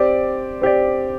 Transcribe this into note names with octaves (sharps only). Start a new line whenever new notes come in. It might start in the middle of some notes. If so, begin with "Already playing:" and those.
Already playing: C4 G4 D5
C4 G4 D5